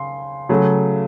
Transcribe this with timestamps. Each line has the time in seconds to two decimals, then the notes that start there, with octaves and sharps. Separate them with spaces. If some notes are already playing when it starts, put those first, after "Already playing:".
Already playing: C#3 C6
0.49 C#3 F#3 A3